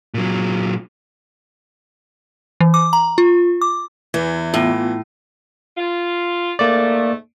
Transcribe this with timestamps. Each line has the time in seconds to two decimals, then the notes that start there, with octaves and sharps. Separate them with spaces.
0.14 A#2 F#3
2.60 E3
2.74 D6
2.93 A#5
3.18 F4
3.61 D6
4.14 E2 E3
4.54 A2 B3 F4
5.77 F4
6.59 G#2 A3 A#3 D5